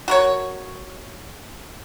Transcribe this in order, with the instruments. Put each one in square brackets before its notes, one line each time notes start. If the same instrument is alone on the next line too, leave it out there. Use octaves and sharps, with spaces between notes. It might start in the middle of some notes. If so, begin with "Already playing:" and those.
[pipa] F#4 A#4 C#5